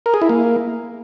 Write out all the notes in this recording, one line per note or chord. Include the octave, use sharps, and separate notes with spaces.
A#4
G#4
E4
A#3